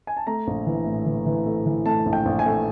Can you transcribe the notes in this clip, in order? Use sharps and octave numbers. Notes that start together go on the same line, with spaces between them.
G#5
A5
A3 A#5
A#1
E3
A2
E3
E3
A3
E3
A3 A5
A#1
G5
A#1
G#5
A3